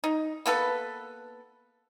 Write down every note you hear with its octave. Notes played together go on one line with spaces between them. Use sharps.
D#4
A#3 B3 A4 B4